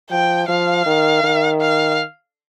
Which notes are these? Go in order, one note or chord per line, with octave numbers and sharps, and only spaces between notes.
F3 G5
F3 F5
D#3
D#3
F5